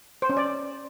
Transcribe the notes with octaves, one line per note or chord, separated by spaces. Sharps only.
C5
C#4
D5